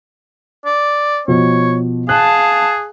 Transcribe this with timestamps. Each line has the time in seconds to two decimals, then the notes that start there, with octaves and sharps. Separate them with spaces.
0.65 D5
1.28 B2 F3 C#5
2.09 G#4 F5 A5 F#6